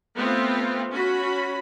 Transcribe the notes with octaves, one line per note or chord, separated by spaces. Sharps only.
A3 B3 C4 F4
C#4 F#4 B5